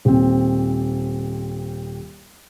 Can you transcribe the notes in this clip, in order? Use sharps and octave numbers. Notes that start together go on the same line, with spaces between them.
D#1 C4